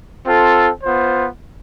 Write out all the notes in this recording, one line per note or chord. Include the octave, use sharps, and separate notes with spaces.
C4 F4 A4
B3 F4 C5